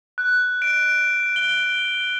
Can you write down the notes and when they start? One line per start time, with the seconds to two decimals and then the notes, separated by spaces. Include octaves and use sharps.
0.18 F#6
0.62 D7
1.36 G7